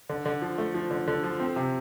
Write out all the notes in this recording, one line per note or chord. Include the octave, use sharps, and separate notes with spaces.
D3
D3
F3
A3
F3
D3
D3
F3
C4
C3